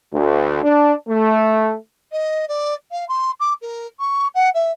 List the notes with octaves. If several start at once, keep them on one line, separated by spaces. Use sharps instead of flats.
D2
D4
A3
D#5
D5
F5
C6
D6
A#4
C#6
F#5
E5